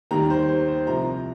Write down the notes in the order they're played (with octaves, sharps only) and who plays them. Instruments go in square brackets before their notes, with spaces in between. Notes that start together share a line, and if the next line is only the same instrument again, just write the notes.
[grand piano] D#2 D#3 G3 A#5
C5
C5
C5
C2 C3 F3 A#5